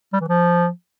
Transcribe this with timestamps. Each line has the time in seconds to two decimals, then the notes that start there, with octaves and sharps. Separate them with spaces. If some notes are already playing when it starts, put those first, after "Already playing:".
0.13 G3
0.21 E3
0.28 F3